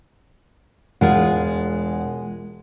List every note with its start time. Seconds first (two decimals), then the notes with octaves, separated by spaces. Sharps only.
1.01 E1 G#3 F4 G#4 F#5